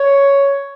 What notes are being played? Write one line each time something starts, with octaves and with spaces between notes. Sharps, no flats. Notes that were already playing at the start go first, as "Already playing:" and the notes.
Already playing: C#5